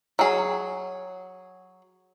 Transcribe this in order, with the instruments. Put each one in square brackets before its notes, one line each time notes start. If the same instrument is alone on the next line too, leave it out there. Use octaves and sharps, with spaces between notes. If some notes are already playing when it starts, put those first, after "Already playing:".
[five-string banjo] F#3 G#4